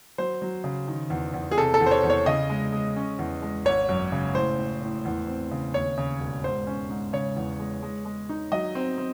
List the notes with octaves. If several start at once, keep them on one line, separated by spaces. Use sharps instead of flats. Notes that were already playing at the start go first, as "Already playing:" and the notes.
F#3 C5
F#3
C#3
D#3
E2
E2
G#4
C3 A4
A4
E2
C5
C#5
E2
C#5
C#3 D#5
G#3
G#3
C#4
E2
G#3
G#1 C#5
F#2
C#3
A2 C5
A2
A2
E2
C4
C#3
D#2 C#5
C#3
E1
G#2 C5
C#4
G#2
C#3 C#5
E2
G#3
G#3
G#3
D#4
F#3 D#5
C4
C4